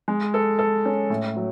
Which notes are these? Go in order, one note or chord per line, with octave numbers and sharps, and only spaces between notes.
G#3
A4
A4
C#4
A2
F#3